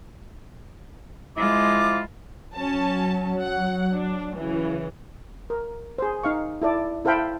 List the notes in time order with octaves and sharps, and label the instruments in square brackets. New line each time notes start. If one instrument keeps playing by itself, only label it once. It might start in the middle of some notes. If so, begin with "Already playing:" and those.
[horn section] F3 E4 F4 [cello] G#3 [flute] D6
[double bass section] F#3 [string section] C#4 A5
[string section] F#5
D4
C#3 E3
[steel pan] A#4
G#4 C5
D#4 F5 C#6
E4 A4 D5
E4 A4 C5 F5 G5 B5